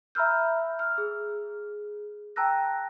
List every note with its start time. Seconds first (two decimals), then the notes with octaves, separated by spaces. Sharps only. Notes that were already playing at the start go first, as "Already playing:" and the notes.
0.15 E5 A#5 B5 E6 F6 G6
0.79 F6
0.98 G#4
2.36 G5 A5 A#5 E6 F#6 A#6